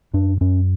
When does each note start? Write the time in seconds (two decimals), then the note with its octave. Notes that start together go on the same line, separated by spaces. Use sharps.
0.13 F#2 D4
0.41 F#2 C#4